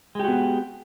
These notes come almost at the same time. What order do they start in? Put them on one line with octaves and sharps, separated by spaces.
G#3 G4 F#4 B3